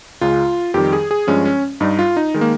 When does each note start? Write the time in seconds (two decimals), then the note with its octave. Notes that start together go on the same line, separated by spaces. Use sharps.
0.21 C#2 C#3 G#3 F4
0.74 F2 D#3 G3 G4
0.93 G#4
1.11 G#4
1.27 G2 F3 G#3 C#4
1.45 C#4
1.81 G2 G3 D#4
1.99 F4
2.17 D#4
2.34 D#3 G#3
2.41 A#3